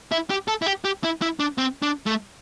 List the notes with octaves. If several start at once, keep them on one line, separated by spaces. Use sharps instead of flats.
E4
G4
A4
E4
G4
G4
E4
E4
D4
C4
D4
A3